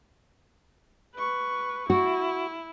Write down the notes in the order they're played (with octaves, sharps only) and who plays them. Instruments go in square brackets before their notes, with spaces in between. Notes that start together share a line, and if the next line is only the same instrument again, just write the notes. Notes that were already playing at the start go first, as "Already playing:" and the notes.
[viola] B4 C#6
[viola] E4 [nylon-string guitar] F#4